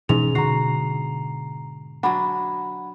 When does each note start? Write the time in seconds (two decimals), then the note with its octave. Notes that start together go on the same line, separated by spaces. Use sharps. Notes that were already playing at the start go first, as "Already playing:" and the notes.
0.09 G#2 B2 E3 C#4 F7
0.35 B2 D3 F#4 A#5 C7
2.03 F#3 D4 F#5 B5